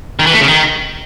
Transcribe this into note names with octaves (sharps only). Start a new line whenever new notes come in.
D#3
E3
A3
C#3
D#3